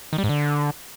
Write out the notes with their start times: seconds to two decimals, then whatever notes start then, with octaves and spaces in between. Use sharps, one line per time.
0.13 D#3
0.18 G3
0.24 G#2
0.29 D3